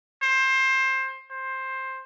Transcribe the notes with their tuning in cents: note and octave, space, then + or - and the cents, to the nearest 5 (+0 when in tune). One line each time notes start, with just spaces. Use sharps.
C5 +20
C5 +15